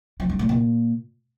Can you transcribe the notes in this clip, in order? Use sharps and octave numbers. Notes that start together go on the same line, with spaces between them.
F3
G2
A2
A#2